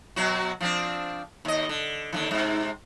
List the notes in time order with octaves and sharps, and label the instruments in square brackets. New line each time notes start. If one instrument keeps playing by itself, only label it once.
[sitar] B2 F#3 F#4
F3 C4 D4
D#2 D#5
D3
D#2 D3 E3
G#2 C3